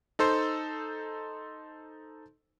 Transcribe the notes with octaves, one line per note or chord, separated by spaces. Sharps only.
D#4 A4 C5 C6